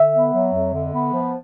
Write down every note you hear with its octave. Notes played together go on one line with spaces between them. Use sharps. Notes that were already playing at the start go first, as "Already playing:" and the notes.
Already playing: D3 E5
B3
F#3
F2
D3
B3
F3